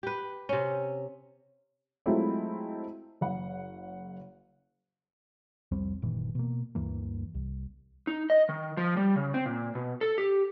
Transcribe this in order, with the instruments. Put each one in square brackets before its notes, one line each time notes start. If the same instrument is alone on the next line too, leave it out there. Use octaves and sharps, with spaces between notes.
[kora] G4 B4
C3 C#4
[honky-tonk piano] F#3 G#3 A3 C4 E4 F4
F#1 F#5
[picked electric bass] C2 F2 G3 C4
F#1 A#2 D#3 E3
B2 A#3
D2 G2 E3 A#3
C2
[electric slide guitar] D#4
D#5
D#3
F3
G3
C#3
C4
A#2
B2
A4
G4